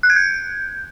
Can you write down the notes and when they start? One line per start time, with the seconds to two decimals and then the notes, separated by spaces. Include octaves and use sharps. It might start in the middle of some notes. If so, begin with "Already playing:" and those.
0.03 F#6
0.10 G#6
0.16 G6